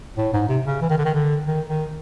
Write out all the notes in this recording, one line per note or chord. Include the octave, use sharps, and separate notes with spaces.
A2
G#2
C3
C#3
E3
D#3
D3
D#3
D3
D#3
D#3